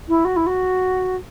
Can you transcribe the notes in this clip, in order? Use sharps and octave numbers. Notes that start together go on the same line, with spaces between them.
E4
F#4
E4
F#4